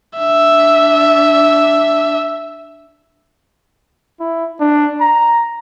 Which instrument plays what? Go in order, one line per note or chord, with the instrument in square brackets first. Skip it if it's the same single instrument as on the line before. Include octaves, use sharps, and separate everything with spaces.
[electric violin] D4 E5
[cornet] E4
D4
A#5